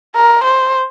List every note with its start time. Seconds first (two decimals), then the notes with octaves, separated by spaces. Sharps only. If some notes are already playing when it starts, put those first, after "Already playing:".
0.16 A#4
0.44 C5